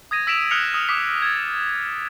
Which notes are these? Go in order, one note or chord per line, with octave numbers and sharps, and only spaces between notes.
D#6 G#6 A#6 D#7
E6 B6 D7 E7 F7
D#6 F6 F#6 C#7 F7
D#6
D6 D#6 B6
G#6 A6